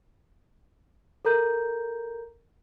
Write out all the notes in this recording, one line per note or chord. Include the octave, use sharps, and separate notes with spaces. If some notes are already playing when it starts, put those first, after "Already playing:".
A4 A#4 A#5 G6